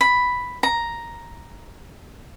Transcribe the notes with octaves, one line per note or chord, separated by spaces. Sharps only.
B5
A#5